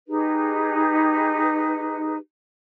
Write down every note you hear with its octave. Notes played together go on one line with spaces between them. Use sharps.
D#4 G4 G#4 B4